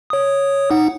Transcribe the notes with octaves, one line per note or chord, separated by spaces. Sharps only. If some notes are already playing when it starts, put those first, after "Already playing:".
C#5 D#6
D#4 F#5